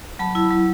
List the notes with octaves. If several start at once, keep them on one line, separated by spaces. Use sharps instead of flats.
F#3 A5 B5
E4
F#3